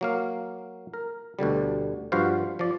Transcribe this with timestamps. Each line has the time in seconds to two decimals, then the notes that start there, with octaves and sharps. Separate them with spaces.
0.01 F#3 A#3 F5
0.94 A#4
1.39 D2 B2 D3 G3
2.12 G2 F3 F#4 B4 C5 F5
2.59 F3 D5